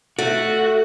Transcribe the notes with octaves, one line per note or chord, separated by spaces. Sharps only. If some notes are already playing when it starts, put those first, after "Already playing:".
A3 F#4